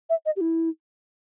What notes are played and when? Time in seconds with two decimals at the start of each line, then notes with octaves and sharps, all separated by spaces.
0.10 E5
0.26 D#5
0.36 G4
0.41 E4